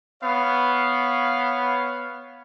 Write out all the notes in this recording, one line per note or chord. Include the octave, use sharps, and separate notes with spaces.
B3 C#5 F5